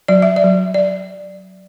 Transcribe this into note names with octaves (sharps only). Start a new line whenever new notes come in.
F#3 D5
E5
D5
F#3
D5